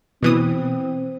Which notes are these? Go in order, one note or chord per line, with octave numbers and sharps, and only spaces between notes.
B2 E3 C4 D#6